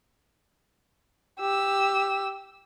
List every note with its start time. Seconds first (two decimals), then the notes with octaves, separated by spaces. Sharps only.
1.40 G4 E6